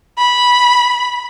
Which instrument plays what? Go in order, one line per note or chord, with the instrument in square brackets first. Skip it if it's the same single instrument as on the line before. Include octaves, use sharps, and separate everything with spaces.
[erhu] B5